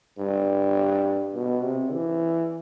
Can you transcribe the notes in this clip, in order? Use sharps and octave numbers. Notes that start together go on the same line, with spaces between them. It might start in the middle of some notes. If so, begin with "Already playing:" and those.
G2
B2
C3
E3